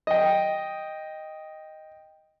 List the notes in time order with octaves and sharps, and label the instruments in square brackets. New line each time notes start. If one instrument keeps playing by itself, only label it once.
[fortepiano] D#5 G5